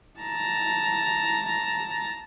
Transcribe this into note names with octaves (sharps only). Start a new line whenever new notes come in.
A5 A#5